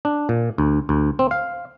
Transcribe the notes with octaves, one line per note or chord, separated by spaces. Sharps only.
D4
A#2
D2
D2
C4
F5